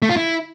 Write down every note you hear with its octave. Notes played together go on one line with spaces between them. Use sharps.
A3
F4
E4